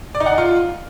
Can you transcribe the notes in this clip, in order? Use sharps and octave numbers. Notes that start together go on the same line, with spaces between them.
D5
D#4
F#5
D#4
F4